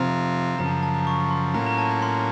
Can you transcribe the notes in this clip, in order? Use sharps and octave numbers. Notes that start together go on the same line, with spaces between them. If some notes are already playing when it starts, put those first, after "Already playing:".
Already playing: C3 F3 C4 F4 A#5
F#2 C#3 F3 A#5
A5
A#5
A5
A#5
C#6
C6
A2 F#3 A#3 C#4 F4 A#5
A#5
A5
A#5
C6